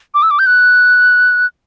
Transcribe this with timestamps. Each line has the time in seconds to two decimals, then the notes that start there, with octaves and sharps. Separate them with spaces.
0.14 D6
0.23 E6
0.31 D6
0.39 G6
0.46 F#6